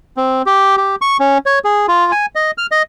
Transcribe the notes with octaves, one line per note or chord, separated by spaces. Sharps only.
C4
G4
G4
C#6
C#4
C#5
G#4
F4
G#5
D#5
F6
D#5